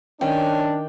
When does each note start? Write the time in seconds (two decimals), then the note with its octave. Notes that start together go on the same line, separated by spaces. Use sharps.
0.21 D#3 C#4 D4 G5